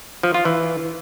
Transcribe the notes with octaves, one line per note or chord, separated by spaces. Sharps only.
F3
F4
E3